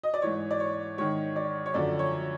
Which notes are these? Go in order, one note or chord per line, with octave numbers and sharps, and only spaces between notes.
D#5
D5
G#2 E3 C#5
D5
C#5
G#2 D#3 C#5
D5
C#5
F#2 D3 F3 D5
C#5